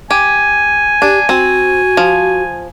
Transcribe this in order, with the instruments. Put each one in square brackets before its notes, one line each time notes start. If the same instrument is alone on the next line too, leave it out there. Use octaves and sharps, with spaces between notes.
[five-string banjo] G4 [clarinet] G#5
[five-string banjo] D4 [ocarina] G4
[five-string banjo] C4 [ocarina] F#4
[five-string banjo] F3